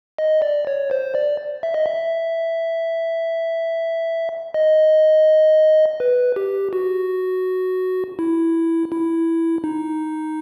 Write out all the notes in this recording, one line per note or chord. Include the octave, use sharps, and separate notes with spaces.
D#5
D5
C#5
C5
D5
E5
D#5
E5
D#5
B4
G4
F#4
E4
E4
D#4